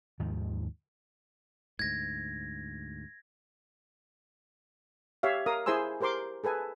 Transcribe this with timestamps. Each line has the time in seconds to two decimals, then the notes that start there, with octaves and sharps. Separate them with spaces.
0.19 D#2 G#2 D#3 F3
1.79 D2 G#2 G#6 A#6
5.23 G4 C#5 E5 F5
5.46 A#4 F5 D#6
5.66 E4 G#4 C5 G#5 C6 E6
6.01 G4 A#4 C5 C6 D6
6.44 G#4 A4 B4 G#5